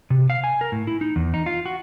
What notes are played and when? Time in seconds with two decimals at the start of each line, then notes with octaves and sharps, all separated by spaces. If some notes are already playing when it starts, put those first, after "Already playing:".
0.10 C3
0.30 F5
0.44 G#5
0.61 A#4
0.72 A2
0.87 E4
1.01 D#4
1.16 E2
1.34 D#4
1.46 F4
1.66 F#4